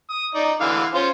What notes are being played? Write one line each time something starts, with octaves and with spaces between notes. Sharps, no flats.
D#6
D#4 D5
D3 E3 F5
C#4 F4 C5